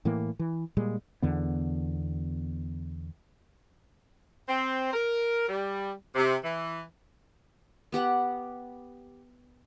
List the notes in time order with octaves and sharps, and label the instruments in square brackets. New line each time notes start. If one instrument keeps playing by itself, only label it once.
[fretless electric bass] A2 E3 A#3
E3
A#2 G3 G#3
E2 D3 B3
[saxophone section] C4
A#4
G3
C3
E3
[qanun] B3 G4 F#5